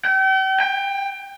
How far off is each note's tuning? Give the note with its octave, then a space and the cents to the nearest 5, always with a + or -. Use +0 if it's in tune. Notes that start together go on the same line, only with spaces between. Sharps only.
G5 -40
G5 +20